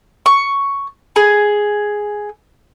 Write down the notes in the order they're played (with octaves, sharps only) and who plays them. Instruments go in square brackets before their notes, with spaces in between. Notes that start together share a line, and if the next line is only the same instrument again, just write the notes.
[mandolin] C#6
G#4